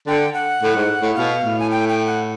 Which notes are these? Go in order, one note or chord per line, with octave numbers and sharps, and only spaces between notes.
D3 G5
F#5
A2
G#2
A2
B2 F5
A2
G#5
G5
G5
F#5